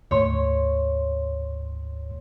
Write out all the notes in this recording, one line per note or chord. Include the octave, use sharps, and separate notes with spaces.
D2 G#2 C#5 C6